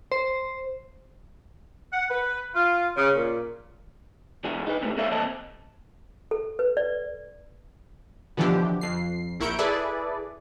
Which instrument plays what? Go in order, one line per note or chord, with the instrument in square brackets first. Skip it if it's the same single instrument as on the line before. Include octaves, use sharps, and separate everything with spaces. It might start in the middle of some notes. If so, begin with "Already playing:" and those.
[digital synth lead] C5
[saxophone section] F#5
B4
F4
C#3
A#2
[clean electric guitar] B2 D3 E3 G#3 F#4 G#4
D#4 B4
C#2 F#2 C3 G#3 A3
G#3 A3 A4 C#5 E5 F5
E3 A#3 C4 D#5 A5
[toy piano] A4
B4
D5
[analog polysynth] B2 D3 E3 F3 D4 G4
F2 C7
A#1 E4 A#4 C#6 G6 D7
E4 G#4 A4 B4 D5